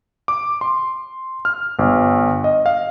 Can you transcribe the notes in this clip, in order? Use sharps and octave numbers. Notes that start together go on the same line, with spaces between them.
D6
C6
F6
G1
D#5
F5